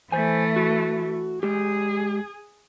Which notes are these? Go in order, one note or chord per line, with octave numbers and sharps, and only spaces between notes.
E3 A3 C5 G#5
F#4
G#3 G4 G#4